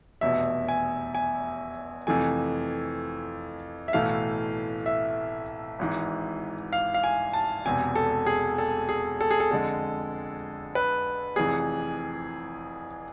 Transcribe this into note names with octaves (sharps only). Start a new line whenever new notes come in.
F1 E2 B2 E5
G#5
G#5
F2 C3 E3 A3 G#5
E5
B1 A2 E3 A3 F5
E5
G#1 G#2 E3
F5
F5
G#5
A5
E1 E2 C3 G#5
A4
G#4
A4
G#4
A4
G#4
A4
F2 D3 G#3 A4
B4
F1 F2 E3 G#4